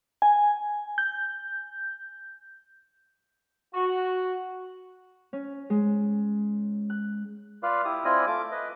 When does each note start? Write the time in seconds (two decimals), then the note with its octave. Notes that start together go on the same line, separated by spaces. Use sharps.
0.22 G#5
0.98 G6
3.74 F#4
5.33 C#4
5.70 G#3
6.90 F#6
7.63 F4 B4 D5 F5
7.85 E4 G4 D#6
8.05 C4 E4 F4 D5 D#5 G#5
8.27 A3 F4 D6
8.52 B4 D#5